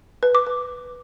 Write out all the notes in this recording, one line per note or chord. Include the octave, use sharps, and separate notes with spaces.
B4
D6
B4